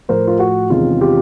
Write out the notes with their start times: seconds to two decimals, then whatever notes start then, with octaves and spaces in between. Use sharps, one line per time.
0.09 A2 F3 A3 A#4 C5
0.27 F4
0.39 F#4
0.70 E2 C3 D#3 G#3 C#4 F4
1.01 F4 G4